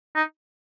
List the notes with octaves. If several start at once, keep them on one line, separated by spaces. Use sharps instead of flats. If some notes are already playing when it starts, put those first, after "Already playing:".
D#4